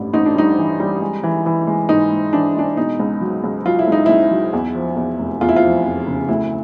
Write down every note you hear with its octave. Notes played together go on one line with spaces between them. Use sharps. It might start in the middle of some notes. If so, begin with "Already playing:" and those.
Already playing: A1 G2 G3
A1 D#4
D4
G3 D#4
E3
G3
G#3
E3
E3
G#3
G#2 D#4
G#3
E3 D4
G#3 D4
B2 D#4
C#2
F#3
C#2
F#3 F4
E4
C#2 D#4
C#2 E4
F#3
E2
F3
E2
F1
E2 F4
E4
F4
F3
F1
C#3
D2 E4